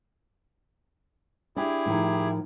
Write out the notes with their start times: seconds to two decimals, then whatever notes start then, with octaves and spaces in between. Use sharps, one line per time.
1.56 D4 E4 G4 G#4
1.86 A2 D#3 F3